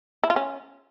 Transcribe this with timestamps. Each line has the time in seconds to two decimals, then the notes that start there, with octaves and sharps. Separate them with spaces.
0.24 E4
0.30 F4
0.36 C#4